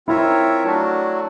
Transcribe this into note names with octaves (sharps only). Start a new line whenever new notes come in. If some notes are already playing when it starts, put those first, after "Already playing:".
C4 E4 F4 A#4 C#5 E5
F#3 A3 D4 F#4